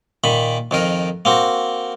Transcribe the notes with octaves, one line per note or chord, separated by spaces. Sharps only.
A#2 D#3 B5
F2 D#3 A#4
A#3 C4 F#4